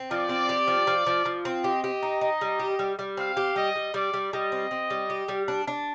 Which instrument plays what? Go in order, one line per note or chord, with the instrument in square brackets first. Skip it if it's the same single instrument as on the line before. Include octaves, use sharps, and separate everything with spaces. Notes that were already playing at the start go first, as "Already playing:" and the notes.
Already playing: [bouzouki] C4
[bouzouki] F3 [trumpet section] D5
[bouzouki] C4
G4
F3
F3
F3
F3
C4
[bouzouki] G4 [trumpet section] D#5
[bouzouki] G4
D#4
D#4
G3
G4
G3
G3
[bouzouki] C4 [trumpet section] F5
[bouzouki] G4
[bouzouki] G3 [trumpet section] D#5
[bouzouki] G3
[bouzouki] G3 [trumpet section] D5
[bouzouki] G3
[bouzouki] G3 [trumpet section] D#5
[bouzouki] C4
C4
G3
G4
G3
D4
D4